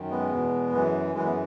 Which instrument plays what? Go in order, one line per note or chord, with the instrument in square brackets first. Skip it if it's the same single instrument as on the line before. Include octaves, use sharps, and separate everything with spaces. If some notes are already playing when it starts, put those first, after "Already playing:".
Already playing: [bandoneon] F#2 D#3
G#3 B3
E2 B2
F#2 E3
F#2 E3 G#3
B3